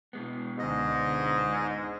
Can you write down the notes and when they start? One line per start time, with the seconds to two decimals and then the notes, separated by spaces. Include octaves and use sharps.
0.13 B2 G#3 B3
0.59 C#2 G#2 D3 D#5